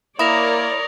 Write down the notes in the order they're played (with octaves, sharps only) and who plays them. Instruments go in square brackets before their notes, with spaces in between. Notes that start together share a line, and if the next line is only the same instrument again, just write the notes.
[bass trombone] A#3 [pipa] E4 [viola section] A#4 C#5 D5 [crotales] D#6 A#6 F7